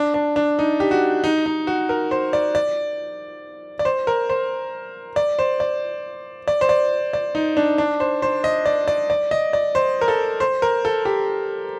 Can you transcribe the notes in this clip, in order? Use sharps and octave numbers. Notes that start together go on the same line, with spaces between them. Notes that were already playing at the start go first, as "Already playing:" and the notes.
Already playing: D4
D4
D4
D#4
G4
F#4
D#4
D#4
F#4
A#4
C5
D5
D5
D5
C5
A#4
C5
D5
C5
D5
D5
C5
D5
D5
D#4
D4
D4
C5
C5
D#5
D5
D5
D5
D#5
D5
C5
A#4
A4
C5
A#4
A4
G4